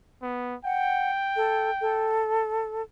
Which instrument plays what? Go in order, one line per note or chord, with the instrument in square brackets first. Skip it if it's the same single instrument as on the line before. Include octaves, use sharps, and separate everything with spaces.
[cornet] B3
[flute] F#5 [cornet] G5
[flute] A4
A4